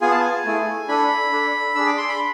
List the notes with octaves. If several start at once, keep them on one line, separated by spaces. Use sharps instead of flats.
B3 F4 G#4 G#5
A5
G#5
A3 E4 G#4
D4 A4 B5
D4 A4
D4 G#4 E6
D6
C6
B5